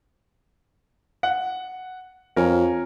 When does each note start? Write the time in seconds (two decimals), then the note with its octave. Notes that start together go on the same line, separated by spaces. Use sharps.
1.23 F#5
2.36 F2 A#4 C#5 G#5